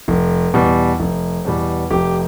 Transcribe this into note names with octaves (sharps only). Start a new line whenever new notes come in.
F1
E2 B2 G3
F1
E2 B2 G3
F1 G4